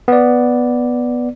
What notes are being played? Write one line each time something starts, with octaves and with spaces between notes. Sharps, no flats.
B3 D5